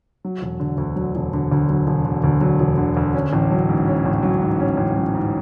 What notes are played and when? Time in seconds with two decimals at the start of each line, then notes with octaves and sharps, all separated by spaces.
0.25 F#3
0.42 E1
0.60 D3
0.78 D2
0.96 F#3
1.15 E1
1.33 D3
1.52 D2
1.70 F#3
1.87 E1
2.06 D3
2.24 D2
2.41 F#3
2.60 E1
2.78 D3
2.97 D2
3.14 C#4
3.33 A1
3.51 F#3
3.69 G#2
3.88 C#4
4.05 A1
4.23 F#3
4.42 G#2
4.60 C#4
4.77 A1
4.96 F#3
5.15 G#2